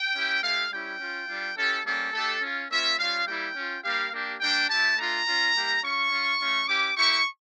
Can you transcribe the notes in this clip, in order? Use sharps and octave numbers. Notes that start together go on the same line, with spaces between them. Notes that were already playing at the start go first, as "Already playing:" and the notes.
Already playing: G5
C#4 E4 G4
A3 E4 G4 F5
G3 C#4 E4 G4 G5
C#4 F4
G3 D4 F4
C#4 E4 G4 A4
G3 A#3 C#4 G4 A4
A3 D4 G4 A4
C#4 F4
A#3 C#4 F4 E5
G3 C#4 F4 F5
G3 A#3 E4 G4 G5
C#4 F4
G3 A#3 D4 G4 F5
A#3 D4 G4
G3 A#3 D4 G5
A3 E4 G4 A5
A3 D4 F4 A#5
C#4 F4
G3 A#3 E4 G4
C#4 F4 C#6
C#4 F4
A3 C#4 F4
C#4 E4 G4 D6
A#3 E4 G4 C#6